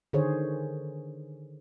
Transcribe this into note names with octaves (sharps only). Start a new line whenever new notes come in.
D3 D#3 G#4 C5 C#5